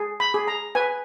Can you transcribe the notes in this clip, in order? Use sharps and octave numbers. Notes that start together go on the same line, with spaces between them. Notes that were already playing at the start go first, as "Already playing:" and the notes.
Already playing: G#4
B5
G#4
A#5
B4 G#5